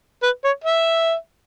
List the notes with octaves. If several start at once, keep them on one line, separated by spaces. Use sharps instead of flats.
B4
C#5
E5